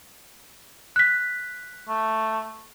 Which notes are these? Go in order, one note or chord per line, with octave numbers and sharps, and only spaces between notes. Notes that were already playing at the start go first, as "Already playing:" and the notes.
F#6 B6
A3